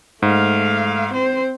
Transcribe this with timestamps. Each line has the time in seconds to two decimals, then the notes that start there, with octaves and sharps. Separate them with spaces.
0.22 G#2 A3 F5
1.12 C4 C5